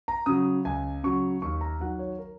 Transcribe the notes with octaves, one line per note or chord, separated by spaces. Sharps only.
A#5
C#3 F#3 D#6
C#2 G#5
C#3 F#3 C#6
D#2 C#6
A#5
D#3 F#3 F#5
C#5
A#4